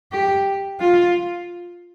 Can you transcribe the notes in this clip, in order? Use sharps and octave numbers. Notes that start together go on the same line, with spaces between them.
G4
F4